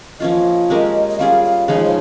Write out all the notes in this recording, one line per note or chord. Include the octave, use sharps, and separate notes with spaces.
F3 A#3 C#4 F4 D#5
G#3 C#4 G4 A#4
D#5
G3 C#4 F4 G#4 F5
F5
C#3 F3 G#3 D#4 D#5
C5